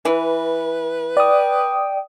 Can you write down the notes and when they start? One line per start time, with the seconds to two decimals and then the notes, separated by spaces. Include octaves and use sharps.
0.05 E3 B4
1.17 D5 G5 D#6